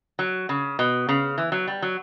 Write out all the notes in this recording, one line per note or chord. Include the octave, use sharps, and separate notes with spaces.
F#3
C#3
B2
C#3
E3
F#3
G3
F#3